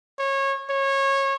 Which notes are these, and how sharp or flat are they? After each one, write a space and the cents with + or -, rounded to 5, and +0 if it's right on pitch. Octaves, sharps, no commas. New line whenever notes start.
C#5 -25
C#5 -20